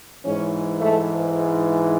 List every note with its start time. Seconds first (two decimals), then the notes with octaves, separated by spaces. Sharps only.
0.24 G#2 E3 C#4
0.79 A3